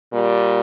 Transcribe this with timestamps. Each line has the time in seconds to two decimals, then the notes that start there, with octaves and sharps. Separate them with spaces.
0.12 A#2 G3